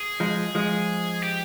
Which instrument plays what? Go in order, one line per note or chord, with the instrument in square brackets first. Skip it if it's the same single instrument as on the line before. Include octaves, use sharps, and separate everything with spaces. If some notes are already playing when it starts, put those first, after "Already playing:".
Already playing: [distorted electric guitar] G#4
[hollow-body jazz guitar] F3 G#3
F3 G#3
[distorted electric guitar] G4